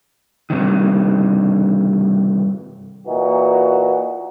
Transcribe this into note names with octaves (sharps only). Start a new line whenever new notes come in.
G2 C3 D#3
A#2 E3 D#4 F#4